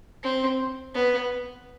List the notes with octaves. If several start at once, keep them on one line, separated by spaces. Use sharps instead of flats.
C4
B3